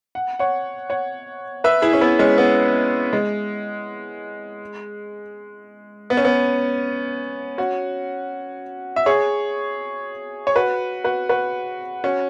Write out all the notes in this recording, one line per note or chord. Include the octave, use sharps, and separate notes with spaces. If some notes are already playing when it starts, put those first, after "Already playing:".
F#5
C#5 F#5
C#5 F#5
B4 E5
E4 G#4
C#4
B3 E4
G#3 C#4
B3
G#3
B3
C#4
B3
C#4 F#4
E5
G#4 C#5
C#5
F#4 B4
F#4 B4
F#4 B4
C#4 F#4